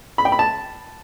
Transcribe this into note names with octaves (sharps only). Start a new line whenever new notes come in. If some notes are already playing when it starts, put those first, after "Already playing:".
B5
G5
B5
A5